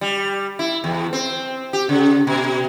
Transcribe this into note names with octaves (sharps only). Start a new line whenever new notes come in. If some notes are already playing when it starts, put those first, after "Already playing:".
G3
E4
E2
C4
G4
C#3
B2